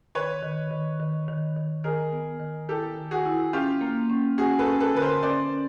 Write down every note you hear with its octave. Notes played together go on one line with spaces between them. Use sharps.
D#3 B4 C#5
D#3
D#3
D#3
D#3
D#3
D#3 G#4 A#4
B3
D#3
E4 G4 A4
D#3
F#4 G#4
E4
C#4 F4 G4
A#3
C#4
C#4 F#4 G#4
A4 B4
C#4
A4 B4
D3 B4
A#4 C5
C#4 C5 D5
C#4